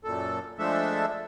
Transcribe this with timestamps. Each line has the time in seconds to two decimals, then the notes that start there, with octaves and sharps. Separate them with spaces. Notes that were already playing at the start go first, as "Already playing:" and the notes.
0.04 F#2 A#2 A4
0.59 F3 G#3 A3 D4 A4 E5